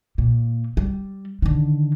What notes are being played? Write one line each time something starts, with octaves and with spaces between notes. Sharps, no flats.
A#2
G3
D3 D#3